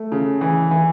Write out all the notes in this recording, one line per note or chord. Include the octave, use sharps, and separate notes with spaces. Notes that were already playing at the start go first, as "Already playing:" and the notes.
Already playing: A3
C#3
E3
E3